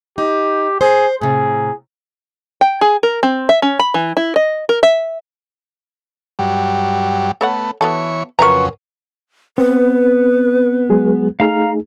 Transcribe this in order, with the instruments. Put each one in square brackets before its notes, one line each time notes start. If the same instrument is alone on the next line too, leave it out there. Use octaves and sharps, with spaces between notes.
[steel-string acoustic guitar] D#4 [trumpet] G4
[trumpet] G#4 [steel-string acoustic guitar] C5
[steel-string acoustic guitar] A2 C3 [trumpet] G#4
[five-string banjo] G5
G#4
A#4
C4
E5
C#4
B5
E3
E4
D#5
A#4
E5
[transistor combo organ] G2 F#3 G3
[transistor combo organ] A3 B3 [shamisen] A4 C#5 F#5
[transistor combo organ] E3 C#5 [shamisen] B3 F#4 A4
[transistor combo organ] F2 C#3 F#3 [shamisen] A#4 E5 A#5 [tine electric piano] B4 C#6
[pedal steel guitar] B3 [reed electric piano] C4 [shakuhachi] B4
[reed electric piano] F#3 G#3 G#4
[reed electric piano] A3 D#4 G#4 [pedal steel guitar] F5 A#5 F6